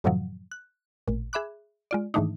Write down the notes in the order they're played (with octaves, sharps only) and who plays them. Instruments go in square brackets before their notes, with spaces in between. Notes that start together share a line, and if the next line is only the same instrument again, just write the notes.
[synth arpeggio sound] F#2 A2 C3 D#3 F3 F#3
F#6
A1 A#2
G#4 E5 B5 D6 F#6
G#3 F4 D5
G#2 D#3 E3 A3 D4 D#4